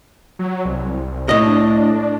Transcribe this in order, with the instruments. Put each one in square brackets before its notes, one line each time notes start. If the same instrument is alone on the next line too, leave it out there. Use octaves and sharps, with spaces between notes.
[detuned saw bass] F#3
C2
[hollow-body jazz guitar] A2 D#5
[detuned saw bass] D4